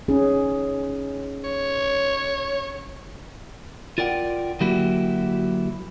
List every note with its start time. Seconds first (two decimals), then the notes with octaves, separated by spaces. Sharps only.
0.08 C#4 D#4 G#4
1.44 C#5
3.98 F4 A#4 D5 F#5 G5
4.60 D3 F#3 A#3 E4 F#4 G4